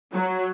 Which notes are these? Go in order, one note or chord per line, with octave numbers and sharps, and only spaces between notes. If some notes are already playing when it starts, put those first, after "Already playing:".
F#3